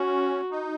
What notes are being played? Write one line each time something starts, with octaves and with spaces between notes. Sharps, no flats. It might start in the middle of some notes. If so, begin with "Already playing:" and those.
Already playing: C#4 F#4
D#4